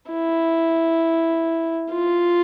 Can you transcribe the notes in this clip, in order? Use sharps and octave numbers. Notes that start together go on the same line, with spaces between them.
E4
F4